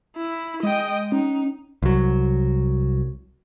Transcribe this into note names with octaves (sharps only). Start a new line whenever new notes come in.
E4
G#3 D#5 G5
C#4 D#4
C2 F#3